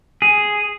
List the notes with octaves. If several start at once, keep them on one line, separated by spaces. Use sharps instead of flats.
G#4